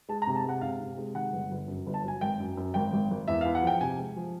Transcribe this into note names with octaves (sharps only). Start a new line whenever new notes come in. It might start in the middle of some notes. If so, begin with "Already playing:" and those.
G#3 A5
A#5
C3
A5
G#3 F#5
C3 F5
C3
G#3
D#3 F#5
G1
G1
F#2
G1
A5
F#3 G#5
G#1 G5
F#2
F#2
G#1 G5
G#1
G#1
E2 E5
E2 F5
F#5
F3 G5
C3 G#5
G#3
F3